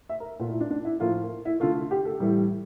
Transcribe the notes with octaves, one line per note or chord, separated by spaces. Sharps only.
E5
A#4
A#2 A3 F4
E4
D4
D4
E4
A2 F3 A#3 F4
E4
D3 A3 F4
G4
A4
A2 E3 G3